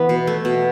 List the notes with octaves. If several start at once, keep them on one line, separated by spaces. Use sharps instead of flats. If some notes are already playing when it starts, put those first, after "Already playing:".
Already playing: E3 B3 B4
B2
A3
B2